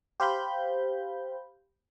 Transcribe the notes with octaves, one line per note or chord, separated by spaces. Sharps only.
G4 C5 F5 B5 G6